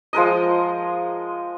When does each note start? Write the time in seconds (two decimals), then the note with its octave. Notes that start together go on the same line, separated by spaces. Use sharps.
0.13 F3 G#3 A#4 D#5